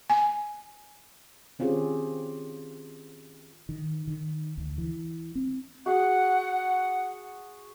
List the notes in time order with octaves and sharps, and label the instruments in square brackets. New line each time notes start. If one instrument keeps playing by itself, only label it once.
[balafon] G#5
[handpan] D#3 C4 C#4 F4 G4 G#4
[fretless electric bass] D#3
D#3
D2
E3
C4
[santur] F#4 G#4 [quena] F#5